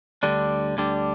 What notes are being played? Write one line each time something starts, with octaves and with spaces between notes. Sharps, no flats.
D2 D3 G3 D4
D2 D3 G3 D4